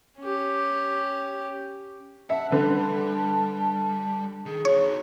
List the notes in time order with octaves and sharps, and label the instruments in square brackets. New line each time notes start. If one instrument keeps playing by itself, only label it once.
[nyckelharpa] C#4 G4
[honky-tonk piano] E5 [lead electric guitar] F#5 [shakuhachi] A5
[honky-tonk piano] D3 B4 [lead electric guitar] G3
[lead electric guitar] D#3 [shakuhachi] G#4
[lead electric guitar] D#4 F#4 [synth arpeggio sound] C#5